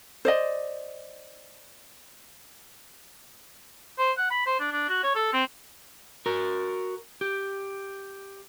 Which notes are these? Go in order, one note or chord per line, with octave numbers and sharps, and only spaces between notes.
C5 D5 D#5
C5
F#5
B5
C5
D4
D4
F#4
C#5
A4
C4
F#4 A#4
G4